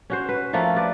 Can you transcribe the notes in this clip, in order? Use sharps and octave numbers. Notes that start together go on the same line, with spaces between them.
C#4 F#4 C5
B4
F3 A3 A#3 F4
B4 D5